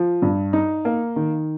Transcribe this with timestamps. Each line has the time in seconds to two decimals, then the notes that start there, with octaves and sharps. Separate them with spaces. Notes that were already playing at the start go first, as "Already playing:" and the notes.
Already playing: F3
0.22 G2
0.53 D#4
0.85 A#3
1.16 D#3